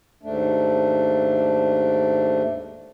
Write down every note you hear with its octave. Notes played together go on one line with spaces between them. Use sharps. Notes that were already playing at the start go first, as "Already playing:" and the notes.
D#2 G#2 A3 D4